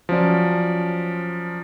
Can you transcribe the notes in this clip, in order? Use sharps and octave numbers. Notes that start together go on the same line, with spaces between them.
F3 F#3 C#4 D5